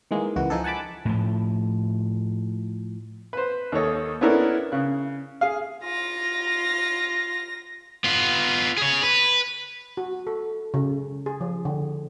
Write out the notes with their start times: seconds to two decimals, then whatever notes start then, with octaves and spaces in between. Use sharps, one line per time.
0.11 D#3 E3 G#3 A#3
0.36 C#2 E3 F#4
0.50 F3 D#4 G#4 A4
0.64 F#5 G#5 A5 B5 D6
1.05 A2 F3
3.33 B4 C5
3.72 D#2 D#3 A4 C#5 D#5
4.21 B3 C#4 D4 E4 A4 A#4
4.72 C#3 F#6
5.41 G#4 F5
5.84 F4 A#6
8.04 B3 F4
8.77 G#4 C#5
9.03 B4
9.97 F#4
10.27 A4
10.74 C#3
11.26 G#4
11.41 F3
11.65 D3